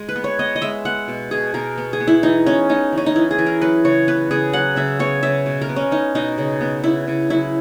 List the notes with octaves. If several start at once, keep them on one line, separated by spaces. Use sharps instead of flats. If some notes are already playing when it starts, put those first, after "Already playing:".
Already playing: G#3
B4
B3
C#5
B3 D#5
D#5
G#3 E5
B3 F#5
B2
B2 G#4
B2 A#4
B3
G#4
B3
E4
E3 D#4
B3 C#4
B3 D#4
E3
C#4
D#4
E3 E4
G#4
E3
A#4
F#3 B4
C#3 C#5
B3 B4
C#3 G#4
F#3 F#5
C#3 E5
B3 C#5
C#3 E5
B2
A#4
B3
C#4
B3 D#4
B2 D#4
C#3
B3
C#3 E4
C#3
F#3 E4